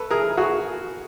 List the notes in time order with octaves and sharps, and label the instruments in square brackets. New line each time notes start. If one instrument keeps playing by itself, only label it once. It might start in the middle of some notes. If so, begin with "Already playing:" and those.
Already playing: [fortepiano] A4 B4
G#4 A#4
F#4 G#4